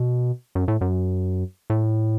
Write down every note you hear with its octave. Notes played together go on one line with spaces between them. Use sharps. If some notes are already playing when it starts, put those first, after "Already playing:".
Already playing: B2
F#2
A2
F#2
A2